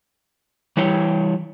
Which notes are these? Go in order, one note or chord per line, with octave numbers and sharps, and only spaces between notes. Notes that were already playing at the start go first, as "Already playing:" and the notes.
E3 G3 E4 C#5 G5